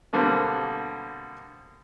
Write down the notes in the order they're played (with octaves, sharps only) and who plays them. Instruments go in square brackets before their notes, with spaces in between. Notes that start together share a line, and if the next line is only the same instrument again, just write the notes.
[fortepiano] B2 D3 G3 A#3 C4